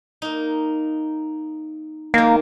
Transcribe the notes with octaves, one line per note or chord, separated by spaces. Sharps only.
A#3 D#4
D#3 G#3 A#3